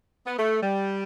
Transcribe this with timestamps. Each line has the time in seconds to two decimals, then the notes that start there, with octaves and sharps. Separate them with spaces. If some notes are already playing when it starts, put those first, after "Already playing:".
0.26 B3
0.37 A3
0.62 G3